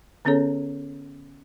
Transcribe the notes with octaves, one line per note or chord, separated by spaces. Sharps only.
D3 B3 C#4 G#4 A4 C#5